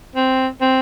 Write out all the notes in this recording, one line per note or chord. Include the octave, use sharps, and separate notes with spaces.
C4
C4